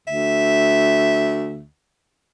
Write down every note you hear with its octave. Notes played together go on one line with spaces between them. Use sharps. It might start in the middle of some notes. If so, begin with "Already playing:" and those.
D2 E5